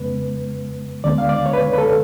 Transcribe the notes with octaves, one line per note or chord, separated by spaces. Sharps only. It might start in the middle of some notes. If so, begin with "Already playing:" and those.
Already playing: F2 C#3 G#3 B3 B4
D2 D3 G#3 B3 D4 D5
F5
D5
C#5
B4
B4
A4